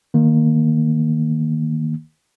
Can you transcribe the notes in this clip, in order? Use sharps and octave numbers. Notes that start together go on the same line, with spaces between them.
D#3 A#3